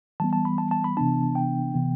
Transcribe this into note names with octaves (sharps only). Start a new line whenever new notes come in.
E3 G3 B3 A5
A5
B5
A5
A5
B5
C3 E3 B3 D4 A5
G5
C3 E3 B3